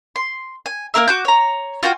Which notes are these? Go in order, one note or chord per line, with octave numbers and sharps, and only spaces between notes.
C6
G#5
A#3 C4 A#4 E5
F#4 D6 G6
C#5 A#5
F4 F#4 G5 G#5